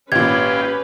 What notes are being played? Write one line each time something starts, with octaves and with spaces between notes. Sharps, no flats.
G#1 A#2 C#4 G4 B4 F5 G#6